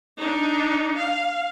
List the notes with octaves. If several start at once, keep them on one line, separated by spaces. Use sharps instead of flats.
D4 D#4
F5